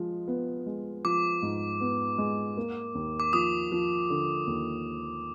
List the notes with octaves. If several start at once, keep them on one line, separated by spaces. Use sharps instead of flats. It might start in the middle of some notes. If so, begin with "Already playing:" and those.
Already playing: F3 G#3
B3
G#3
F3 D6
G#2
B3
G#3
A#3
D#2
D6
F3 D#6
F3
D3
D#2